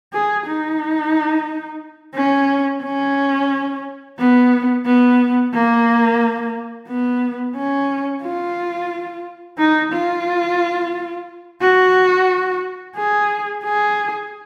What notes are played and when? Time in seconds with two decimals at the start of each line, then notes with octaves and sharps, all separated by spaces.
0.13 G#4
0.47 D#4
2.15 C#4
2.83 C#4
4.19 B3
4.86 B3
5.54 A#3
6.88 B3
7.56 C#4
8.24 F4
9.58 D#4
9.93 F4
11.61 F#4
12.96 G#4
13.64 G#4